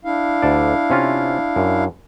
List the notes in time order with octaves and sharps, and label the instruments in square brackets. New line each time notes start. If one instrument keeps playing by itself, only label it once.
[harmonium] D4 E4 F5
[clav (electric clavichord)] D2 A4 D5
C3 C#4 F4
F#2